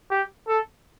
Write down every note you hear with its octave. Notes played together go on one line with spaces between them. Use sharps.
G4
A4